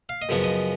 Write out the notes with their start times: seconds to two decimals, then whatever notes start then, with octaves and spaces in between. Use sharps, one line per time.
0.09 F5
0.22 D#5
0.29 F#2 C#3 F3 B3 C#5
0.44 D#5